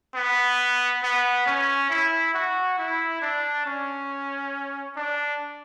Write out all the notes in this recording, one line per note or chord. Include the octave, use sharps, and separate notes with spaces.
B3
B3
C#4
E4
F#4
E4
D4
C#4
D4